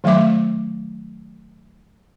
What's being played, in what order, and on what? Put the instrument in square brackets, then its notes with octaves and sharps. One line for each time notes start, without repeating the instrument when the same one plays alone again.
[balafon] D#3 F#3 A3 E5 D6